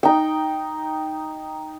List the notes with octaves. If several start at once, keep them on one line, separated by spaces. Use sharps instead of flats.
D#4 G5